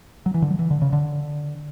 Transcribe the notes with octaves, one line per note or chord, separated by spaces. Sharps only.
F#3
E3
D3
F#3
E3
D3
C#3
D3